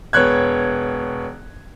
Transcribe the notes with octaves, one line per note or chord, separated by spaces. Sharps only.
E1 B3 C#5 F#6 G#6